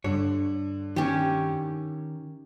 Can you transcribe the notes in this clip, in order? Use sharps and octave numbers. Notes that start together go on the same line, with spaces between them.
G2 D3 C#5
D#3 C#4 G4